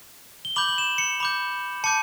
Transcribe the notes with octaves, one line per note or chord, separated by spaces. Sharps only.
G7
B5 D6 G6 F#7
F#7
E7
C#7
B5 D6 G6
A5 D6 G6 C#7